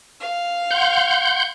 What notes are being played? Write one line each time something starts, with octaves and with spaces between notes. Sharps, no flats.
F5
F#5 C6 G6